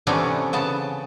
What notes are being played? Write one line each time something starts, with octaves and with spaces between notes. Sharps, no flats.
C3 E3 A3 B3 C#4 D4
C#3 B3 A5